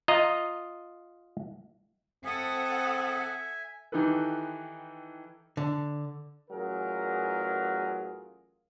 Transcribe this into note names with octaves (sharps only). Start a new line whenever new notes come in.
F4 D#5 A#5
C4 A4 E5 F#5 G#5 D#6
D#3 E3 D#4 G4 A4 B4
D3
A1 F#3 F4 G#4 A#4